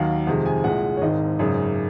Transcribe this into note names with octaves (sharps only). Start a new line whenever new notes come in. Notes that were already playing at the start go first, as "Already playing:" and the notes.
Already playing: D#2 D#3 F#3 F5
F2 C3 D#3 G#3 F#5
G#5
C2 A#2 G#3 F#5
C#5
G#1 G#2 D#3 D#5
G#1 F#2 C#3 G#3